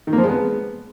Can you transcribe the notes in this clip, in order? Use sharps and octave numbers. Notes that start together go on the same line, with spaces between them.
D#3
A#3
F3
G#3
B3